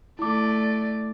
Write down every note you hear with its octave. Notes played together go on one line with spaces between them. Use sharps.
A3 E4 D5 D6